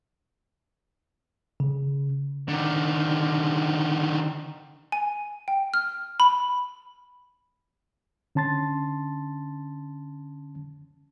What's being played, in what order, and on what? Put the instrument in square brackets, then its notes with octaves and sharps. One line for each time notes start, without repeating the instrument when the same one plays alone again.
[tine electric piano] C#3
[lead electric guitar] D3 D#3
[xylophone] G#5
G5
F6
B5
[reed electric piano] D3 C#4 A5 C6 A6